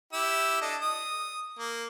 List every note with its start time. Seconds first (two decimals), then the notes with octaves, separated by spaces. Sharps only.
0.13 E4 G4 E6
0.61 D4 A4 D#5
0.81 D#6
1.59 A#3